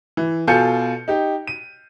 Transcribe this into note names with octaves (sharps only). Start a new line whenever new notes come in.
E3
B2 F4 A4 G#5 G6 C#7
D#4 G4
D#7